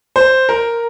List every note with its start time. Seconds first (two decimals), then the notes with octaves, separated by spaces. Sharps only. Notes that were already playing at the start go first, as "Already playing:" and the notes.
0.16 C5
0.49 A#4